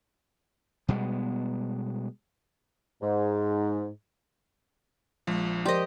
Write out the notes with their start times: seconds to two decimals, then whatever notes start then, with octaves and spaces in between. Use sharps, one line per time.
0.88 B2 G3 G#3 B3
3.02 G#2
5.27 A#1 F3 G#3
5.65 F3 G4 A#4 C5 D5 D#5 C6